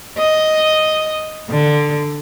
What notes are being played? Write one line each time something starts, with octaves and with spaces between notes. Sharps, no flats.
D#5
D3